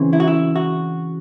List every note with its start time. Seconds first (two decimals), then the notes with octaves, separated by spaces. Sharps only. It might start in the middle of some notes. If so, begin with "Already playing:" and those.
Already playing: C#3 E3 C4
0.13 E4
0.20 F#4
0.28 E4
0.56 F#4